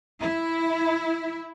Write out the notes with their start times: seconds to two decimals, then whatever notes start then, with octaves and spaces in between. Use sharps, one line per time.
0.20 E4